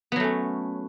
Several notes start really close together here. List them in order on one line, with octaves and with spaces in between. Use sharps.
B3 F#3 A3 C#4